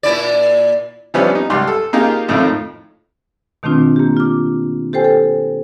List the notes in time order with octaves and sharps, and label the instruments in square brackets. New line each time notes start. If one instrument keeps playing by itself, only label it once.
[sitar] A#2 E4 D5
[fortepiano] E3 F3 G3 B3 C#4 D4
D#4
C#2 G3 C6
A4
A#3 D#4 F4 G4 G#4
F2 A2 D#3 A3 D#4 F4
[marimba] B2 D#3 A3 C4 D4 F4
A#3 G4
F4 D6
G4 A4 C5 G5 G#5
A4